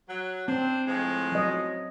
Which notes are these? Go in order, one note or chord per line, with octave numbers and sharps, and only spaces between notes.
F#3
C4 D4 C5
A2 F3 G#3
F#3 D#5